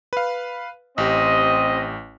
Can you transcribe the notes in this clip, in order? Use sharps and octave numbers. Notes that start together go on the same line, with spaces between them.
B4 F5
A1 C4 G4 D#5